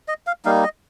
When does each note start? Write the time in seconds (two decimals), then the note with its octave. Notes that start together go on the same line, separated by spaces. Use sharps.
0.08 D#5
0.27 F5
0.45 G3 A#3 D#4 F5
0.63 D#5